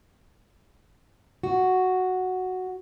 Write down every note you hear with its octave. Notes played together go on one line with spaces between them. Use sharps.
F#4